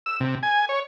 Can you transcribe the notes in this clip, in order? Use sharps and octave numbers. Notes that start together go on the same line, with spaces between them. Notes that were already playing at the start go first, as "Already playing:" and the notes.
E6
C3
G#5
C#5